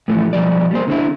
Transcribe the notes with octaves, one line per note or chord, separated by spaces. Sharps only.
A2 E3 F3 A3
B1 F3 G3 D5
G3 A#3 C5
D3 C4 E4